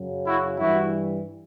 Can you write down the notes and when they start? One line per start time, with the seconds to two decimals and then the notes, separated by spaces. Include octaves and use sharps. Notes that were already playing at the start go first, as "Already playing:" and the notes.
Already playing: F#2 C#3 F#3
0.25 E4 F#4
0.59 G2 E3 G3 E4 F#4